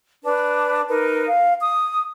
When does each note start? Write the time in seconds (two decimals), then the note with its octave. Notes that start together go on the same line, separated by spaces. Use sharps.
0.23 D4 B4
0.89 D#4 A#4 B4
1.27 F5
1.62 D#6